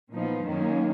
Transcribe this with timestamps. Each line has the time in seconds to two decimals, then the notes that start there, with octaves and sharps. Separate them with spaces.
0.13 A#2 F3 B3 D#4
0.46 F#2 D#3 A#3 C#4